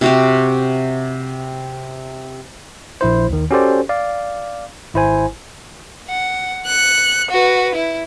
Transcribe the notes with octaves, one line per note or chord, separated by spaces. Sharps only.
C3 F#4 G4
A#1 E4 C5
D#2 D#3
C#4 F#4 G4 A4 C5 D5
D5 F5
G#1 E4 C5 G#5
F#5
F#6 C#7
F#4 B4
E4